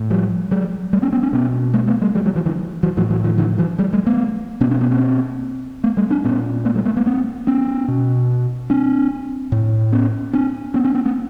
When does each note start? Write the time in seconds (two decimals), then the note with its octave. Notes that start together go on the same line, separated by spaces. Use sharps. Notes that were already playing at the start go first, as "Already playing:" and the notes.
Already playing: A2
0.10 F3 G3
0.51 F#3 G#3
0.93 G3 A3
1.02 B3 C#4
1.12 B3 C#4
1.23 C4 D4
1.33 B2 B3 C#4
1.74 G#3 A#3
1.87 A3 B3
2.02 G3 A3
2.15 F#3 G#3
2.25 F3 G3
2.35 E3 F#3
2.46 D3 E3
2.83 E3 F#3
2.97 A2 E3 F#3
3.10 E3 F#3
3.24 D#3 F3
3.38 D3 E3
3.58 E3 F#3
3.78 F#3 G#3
3.93 G3 A3
4.06 A3 B3
4.61 B2 B3 C#4
4.71 C4 D4
4.81 B3 C#4
4.91 A#3 C4
5.84 A3 B3
5.97 G3 A3
6.10 C4 D4
6.24 A#2 B3 C#4
6.65 A3 B3
6.75 G3 A3
6.85 G#3 A#3
6.96 A3 B3
7.06 A#3 C4
7.47 B3 C#4
7.88 B2
8.70 C4 D4
9.52 A2
9.93 B3 C#4
10.33 C4 D4
10.74 B3 C#4
10.84 C4 D4
10.95 B3 C#4
11.05 A#3 C4